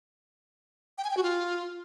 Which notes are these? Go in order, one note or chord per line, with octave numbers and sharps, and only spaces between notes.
G5
G#5
G5
F#4
F4